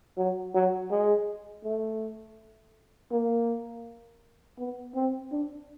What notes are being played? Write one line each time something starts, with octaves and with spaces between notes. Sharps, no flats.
F#3
F#3
G#3
A3
A#3
B3
C4
D4